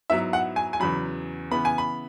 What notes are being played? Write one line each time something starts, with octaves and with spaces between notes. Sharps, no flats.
G#2 F#3 B3 E4 E5
F#5
G#5
G#5
E2 C#3 F#3 B5
C#3 E3 B3 B5
G#5
B5